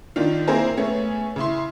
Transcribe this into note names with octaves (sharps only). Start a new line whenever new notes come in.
D3 D#3 D4 F4
A#3 C4 E4 G#4 A#4 C5
A3 B3 C#4 G#4
C#3 E4 C6